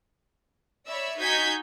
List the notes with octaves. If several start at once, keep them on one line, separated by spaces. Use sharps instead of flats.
C#5 D5 E5 B5 E6
D#4 F#4 G#5 G6 G#6 B6